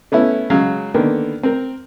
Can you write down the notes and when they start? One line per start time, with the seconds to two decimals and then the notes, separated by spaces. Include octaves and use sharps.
0.12 A3 B3 C#4 E4
0.50 C#3 F#3 G#3 F5
0.94 D3 D#3 A#3 B3
1.43 C4 A#4